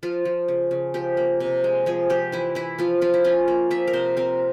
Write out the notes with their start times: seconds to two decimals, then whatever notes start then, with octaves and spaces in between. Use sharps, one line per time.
0.03 F3 F4
0.25 F3
0.48 C#3
0.71 C#3
0.94 F3 G4
1.17 A#3
1.40 C3
1.64 G#3
1.86 F3 G#4
2.10 F3 G4
2.32 E3 E4
2.55 E3 E4
2.78 F3 F4
3.01 F3 F4
3.14 E4
3.24 C#4 F4
3.48 A#3
3.71 F3 E5
3.87 A#4
3.93 C3 C5
4.17 C4 A#4